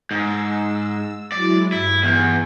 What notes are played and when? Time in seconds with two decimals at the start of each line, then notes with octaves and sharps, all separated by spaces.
0.11 G#2 E6
1.32 F#3 G#3 E4 D5
1.72 G2 E4
2.04 E2